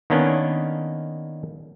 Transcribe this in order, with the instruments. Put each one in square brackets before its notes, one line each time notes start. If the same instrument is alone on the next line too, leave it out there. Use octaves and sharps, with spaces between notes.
[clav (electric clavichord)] D#3 A#3 B3 C#4 D4 D#5